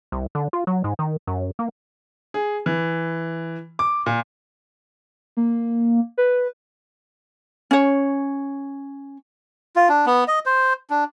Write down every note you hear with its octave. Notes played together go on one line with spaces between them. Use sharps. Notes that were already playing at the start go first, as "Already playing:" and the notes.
C2
D3
F4
F#3
G#2
D#3
F#2
A#3
G#4
E3
D6
A#2
A#3
B4
C#4 C#5
F4
D4
B3
D#5
C5
D4